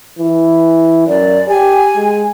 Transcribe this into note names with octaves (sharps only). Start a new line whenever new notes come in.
E3
F#2 D5
G4 G#5
G#3